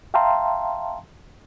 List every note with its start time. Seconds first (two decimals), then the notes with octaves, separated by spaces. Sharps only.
0.14 E5 F5 G5 A5 A#5 C6